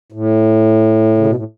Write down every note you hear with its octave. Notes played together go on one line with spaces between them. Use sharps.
A2
C#3
B2
A2